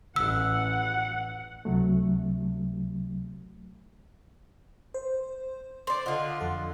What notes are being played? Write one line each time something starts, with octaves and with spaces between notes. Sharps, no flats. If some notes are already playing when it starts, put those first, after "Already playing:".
A1 F#5 E6
C#2 C3 F#3 A3
C5
C5 D5 C6 D6
D3 F4 D#5 F#5
F2 A4 F#5